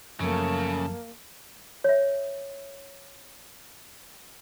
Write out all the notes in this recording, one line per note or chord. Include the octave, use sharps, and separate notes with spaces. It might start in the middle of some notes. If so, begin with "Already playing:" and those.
F#2 C#3 F3 F#3 A3 A#3 A5
C#5 E5